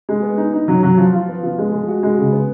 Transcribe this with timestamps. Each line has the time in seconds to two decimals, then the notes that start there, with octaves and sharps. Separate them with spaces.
0.09 G#3
0.22 B3
0.37 D#4
0.53 D#4
0.68 F#3
0.83 F#3
0.97 F3
1.13 F4
1.28 B3
1.43 F3
1.58 G#3
1.72 G#3
1.88 F#4
2.03 G#3
2.18 C#3
2.32 B3